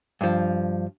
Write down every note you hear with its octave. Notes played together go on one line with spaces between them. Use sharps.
G2 F3